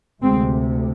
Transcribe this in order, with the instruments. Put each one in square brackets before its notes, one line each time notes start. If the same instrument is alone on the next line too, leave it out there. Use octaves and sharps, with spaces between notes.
[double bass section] D2 C3 G#3 C4